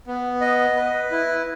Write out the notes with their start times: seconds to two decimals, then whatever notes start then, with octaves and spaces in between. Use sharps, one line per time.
0.07 B3
0.41 D#5
0.77 B4
1.11 E4